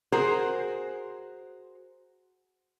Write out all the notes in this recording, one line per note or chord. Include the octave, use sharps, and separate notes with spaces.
F#4 G#4 A#4 C5